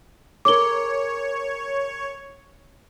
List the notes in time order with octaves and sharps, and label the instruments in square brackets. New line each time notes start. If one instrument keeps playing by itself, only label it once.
[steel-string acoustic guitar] G#4 A#4 [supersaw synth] C#5 [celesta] D6 G7